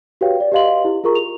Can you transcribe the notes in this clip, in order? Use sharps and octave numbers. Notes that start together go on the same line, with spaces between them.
F#4 G4 B4 C#5 F5 G5
D5
G4 B4 D#5 F5 C6 F#7
E4 G4
F4 G#4 A#4 A#5 C#6
F7